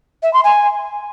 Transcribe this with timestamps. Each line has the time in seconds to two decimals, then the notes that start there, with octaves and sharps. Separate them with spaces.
0.23 E5
0.33 C6
0.44 G#5